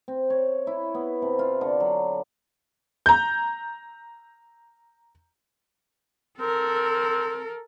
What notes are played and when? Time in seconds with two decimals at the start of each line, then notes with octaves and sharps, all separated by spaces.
0.08 C4
0.30 C#5
0.67 E4
0.94 B3
1.22 C3
1.39 F4
1.61 D3
1.80 F#3
3.06 A#5 G6
6.40 C4 A4 A#4